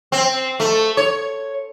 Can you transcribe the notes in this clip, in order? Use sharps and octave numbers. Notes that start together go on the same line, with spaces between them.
C4
A3
C#5